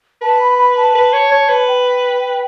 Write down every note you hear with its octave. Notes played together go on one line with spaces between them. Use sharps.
B4 A5
B5
B5
A5
B4
C#5
C#5
B4
A5
G5